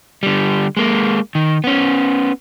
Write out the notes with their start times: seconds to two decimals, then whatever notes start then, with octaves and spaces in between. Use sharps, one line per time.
0.23 D3 G3
0.77 G#3 A#3
1.35 D#3
1.64 B3 C#4